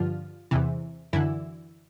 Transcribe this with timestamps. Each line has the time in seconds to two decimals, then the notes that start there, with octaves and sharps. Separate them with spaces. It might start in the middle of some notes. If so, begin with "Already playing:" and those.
Already playing: G2 D3 F3 F4
0.51 E2 C3 E3
1.13 F#2 D3 E3 E4